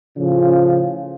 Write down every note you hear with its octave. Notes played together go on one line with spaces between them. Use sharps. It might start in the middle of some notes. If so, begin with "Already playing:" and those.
A2 C#3 F3